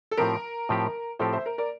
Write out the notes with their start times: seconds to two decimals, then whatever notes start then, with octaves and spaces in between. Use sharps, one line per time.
0.11 A4
0.17 A2 F3 C4 G4 A#4
0.69 A2 F3 C4 G4
1.19 A2 F3 C4 G4 A4 C5
1.33 C5 E5
1.46 A#4
1.58 A#4 D5